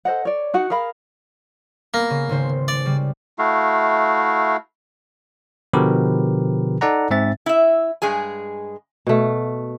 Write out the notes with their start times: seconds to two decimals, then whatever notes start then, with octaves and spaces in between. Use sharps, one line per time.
0.05 A4 C5 D#5 F#5
0.25 C#5 D5
0.54 D#4 F#4 F#5
0.70 G#4 A#4 F5 B5
1.94 A#3 B3 A#6
2.10 C#3
2.29 G#1 C#3 C5
2.68 D5
2.86 C#3 G3
3.39 A3 E4 F#4 F5
5.73 B2 D3 F3 G4 A#4 B4
6.81 D#4 A4 D5 F#5 A#5
7.11 G#2 C4 E5 A6
7.46 E4 E5
8.02 G2 G#3 G#4 G#5
9.07 B2 A3